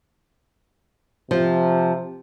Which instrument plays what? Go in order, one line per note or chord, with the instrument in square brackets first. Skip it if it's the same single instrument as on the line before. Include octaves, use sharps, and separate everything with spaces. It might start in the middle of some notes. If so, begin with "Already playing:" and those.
[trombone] C3 [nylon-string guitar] F3